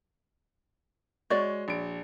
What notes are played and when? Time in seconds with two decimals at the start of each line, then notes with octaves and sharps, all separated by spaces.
1.30 G#3 F#4 C#5 D5
1.68 A#1 D7